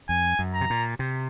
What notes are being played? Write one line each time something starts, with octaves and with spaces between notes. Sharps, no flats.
F2 G#5
F#2
A#5
C3
A#2
C3